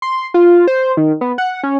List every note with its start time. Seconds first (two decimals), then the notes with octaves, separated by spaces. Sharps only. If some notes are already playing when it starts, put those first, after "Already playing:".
0.02 C6
0.34 F4
0.67 C5
0.97 D#3
1.21 B3
1.38 F#5
1.63 C#4